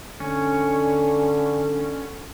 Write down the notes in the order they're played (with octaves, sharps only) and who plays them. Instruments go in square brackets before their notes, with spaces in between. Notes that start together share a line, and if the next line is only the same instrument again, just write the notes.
[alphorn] D3 [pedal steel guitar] C#4